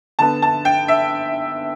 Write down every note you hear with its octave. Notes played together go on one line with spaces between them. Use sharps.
D3 B3 A5
A5
G5
E5